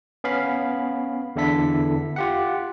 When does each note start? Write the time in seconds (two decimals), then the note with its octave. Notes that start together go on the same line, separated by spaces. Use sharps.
0.24 B3 C#4 F5 B5
1.36 E2 D3 E4 A4 B6
2.16 F4 G4 F#5